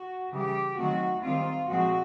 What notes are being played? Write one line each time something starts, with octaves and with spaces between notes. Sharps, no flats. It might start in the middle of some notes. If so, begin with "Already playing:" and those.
Already playing: F#4
C#3 E3 G3 G4
D#3 F#3 A3 C4 F#4
D#3 G3 C4 F4
A#2 F3 G#3 C4 F#4